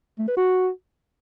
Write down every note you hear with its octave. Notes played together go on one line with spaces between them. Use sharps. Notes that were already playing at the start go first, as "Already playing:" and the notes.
A3
B4
F#4